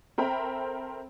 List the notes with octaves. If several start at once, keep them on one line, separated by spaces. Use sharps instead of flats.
C4 A4 A#4 E5 G5 B5